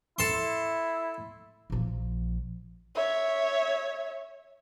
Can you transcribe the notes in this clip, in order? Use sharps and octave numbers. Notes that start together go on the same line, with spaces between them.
E4 A4 C6
A#1 F3
C#5 E5